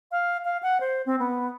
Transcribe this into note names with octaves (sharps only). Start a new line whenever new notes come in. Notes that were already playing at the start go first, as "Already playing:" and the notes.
F5
F5
F#5
C5
C4
B3